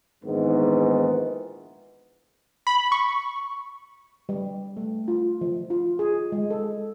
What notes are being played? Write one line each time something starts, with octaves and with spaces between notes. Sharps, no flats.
A#1 G#2 D#3 E3 G#3 B3
B5
C#6
G3
A3
F4
F3
F4
G#4
G#3
A4